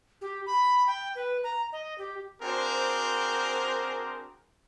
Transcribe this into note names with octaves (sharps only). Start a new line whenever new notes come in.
G4
B5
G5
B4
A#5
D#5
G4
C4 D4 F#4 G#4 A#4 C5